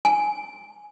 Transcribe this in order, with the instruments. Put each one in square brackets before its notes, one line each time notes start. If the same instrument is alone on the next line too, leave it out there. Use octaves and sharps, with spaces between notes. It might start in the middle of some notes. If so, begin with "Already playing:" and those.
[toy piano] G#5